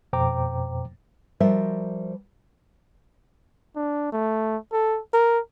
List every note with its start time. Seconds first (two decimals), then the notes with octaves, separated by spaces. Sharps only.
0.13 F2 B2 C5 G5 A#5 D6
1.40 F3 G3 F#4 A#4 C5 E5
3.76 D4
4.13 A3
4.73 A4
5.13 A#4